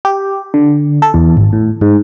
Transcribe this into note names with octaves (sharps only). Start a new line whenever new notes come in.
G4
D3
A4
E2
G#1
A2
G#2